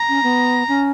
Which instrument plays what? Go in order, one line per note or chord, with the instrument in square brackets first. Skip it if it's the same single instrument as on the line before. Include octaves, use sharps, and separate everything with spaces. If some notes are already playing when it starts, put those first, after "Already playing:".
Already playing: [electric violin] A#5
[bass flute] C#4
B3
C#4